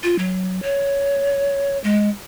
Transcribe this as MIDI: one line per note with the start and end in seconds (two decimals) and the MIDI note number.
0.03 0.18 65
0.18 0.60 54
0.63 1.78 73
1.84 2.09 56